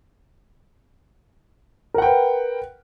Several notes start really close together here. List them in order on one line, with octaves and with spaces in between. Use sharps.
A#4 F#5 G5 B4